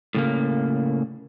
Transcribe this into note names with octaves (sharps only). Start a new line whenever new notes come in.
A2 C#3 A#3